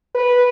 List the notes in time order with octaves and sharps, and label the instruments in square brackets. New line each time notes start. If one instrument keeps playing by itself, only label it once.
[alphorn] B4